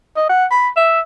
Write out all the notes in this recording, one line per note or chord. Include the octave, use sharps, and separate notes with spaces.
D#5
F#5
B5
E5